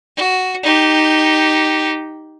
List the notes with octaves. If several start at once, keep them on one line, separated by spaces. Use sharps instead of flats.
F#4
D#4 G4